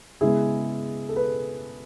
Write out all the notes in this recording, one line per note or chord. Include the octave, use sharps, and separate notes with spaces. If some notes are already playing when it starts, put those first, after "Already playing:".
C#3 G#3 B3 E4 G#4
A4
B4